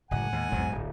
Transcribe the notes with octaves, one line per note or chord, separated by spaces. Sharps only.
F#1 A2 G#3 F#5 G#5
D#2
A#1 E2 G#2 F#3
D1 A#1 F4